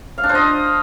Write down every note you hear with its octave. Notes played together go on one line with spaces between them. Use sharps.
F5
D4
C5
D#5